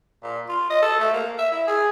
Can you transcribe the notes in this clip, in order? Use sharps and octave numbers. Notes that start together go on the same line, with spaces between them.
A#2
F4
D#5
A4
A3
A#3
E5
E4
G#4